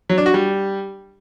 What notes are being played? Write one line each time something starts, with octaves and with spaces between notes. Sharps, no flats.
F#3
D4
F#4
G3